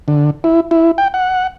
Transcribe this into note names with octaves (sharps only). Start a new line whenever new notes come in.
D3
E4
E4
G5
F#5